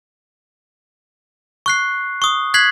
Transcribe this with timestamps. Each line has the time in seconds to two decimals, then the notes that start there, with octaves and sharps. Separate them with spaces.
1.66 C#6 F#6 C7
2.22 C#6 D#6
2.54 F#6 G#6 B6 C7 F#7